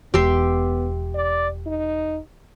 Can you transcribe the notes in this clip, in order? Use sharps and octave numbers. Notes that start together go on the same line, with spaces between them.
E1 B3 G4 E5 C6
D5
D#4